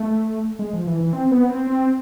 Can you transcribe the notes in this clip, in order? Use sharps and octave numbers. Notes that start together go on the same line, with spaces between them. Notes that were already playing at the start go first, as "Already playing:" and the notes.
Already playing: A3
G#3
F3
E3
E3
C4
B3
C4
C4